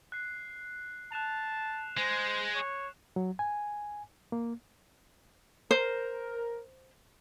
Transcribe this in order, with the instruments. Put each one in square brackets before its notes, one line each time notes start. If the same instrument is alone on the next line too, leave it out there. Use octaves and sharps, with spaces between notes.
[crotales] F#6 C7
[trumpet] A5 [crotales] F#6 E7 F7
[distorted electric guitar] G#3 [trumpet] C5
[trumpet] C#5
[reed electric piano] F#3
G#5
A#3
[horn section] A#4 [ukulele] C5